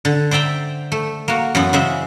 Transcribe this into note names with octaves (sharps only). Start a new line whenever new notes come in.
D3
C5 D5 E5 G5 A#5
A3
A#3 F#4
F#2 E3 B3
C#3 G#3 C5 E5